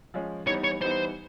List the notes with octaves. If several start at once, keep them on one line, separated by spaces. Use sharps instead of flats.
F3 G#3 C#4
E3 G3 B3 D#4 C#5
C#5
E3 G3 B3 D#4 C5